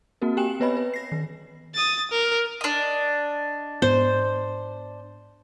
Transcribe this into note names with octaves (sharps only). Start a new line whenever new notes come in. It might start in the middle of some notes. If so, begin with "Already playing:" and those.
A#3 C4 F#4 A#4
G4 G5 G#5 E7 F#7
B3 B4 C#5 D#5 B5
B4
A#6 C7
D#3
D#6 A6
A#4
D4 D#5
G#2 B3 C5